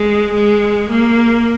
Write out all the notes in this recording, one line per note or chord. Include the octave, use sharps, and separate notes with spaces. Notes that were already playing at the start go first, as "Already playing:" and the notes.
Already playing: G#3
G#3
A#3